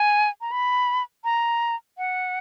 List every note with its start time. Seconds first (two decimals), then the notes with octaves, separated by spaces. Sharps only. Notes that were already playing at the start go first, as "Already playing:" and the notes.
Already playing: G#5
0.41 A#5
0.52 B5
1.24 A#5
1.98 F#5